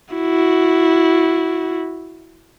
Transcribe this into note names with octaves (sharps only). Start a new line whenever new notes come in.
E4 F#4